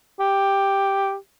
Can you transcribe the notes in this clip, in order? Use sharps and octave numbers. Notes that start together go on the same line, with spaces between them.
G4